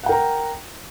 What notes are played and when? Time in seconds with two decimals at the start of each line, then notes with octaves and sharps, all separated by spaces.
0.03 F#5
0.06 G5
0.09 A#4
0.12 A#5